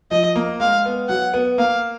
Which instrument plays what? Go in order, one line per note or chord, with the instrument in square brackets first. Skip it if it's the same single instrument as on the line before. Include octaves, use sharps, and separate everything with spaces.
[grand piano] F3 [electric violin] D#5
[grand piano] A#3
[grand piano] G#3 [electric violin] F5
[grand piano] B3
[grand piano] F#3 [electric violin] F#5
[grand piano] B3
[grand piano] A#3 [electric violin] F5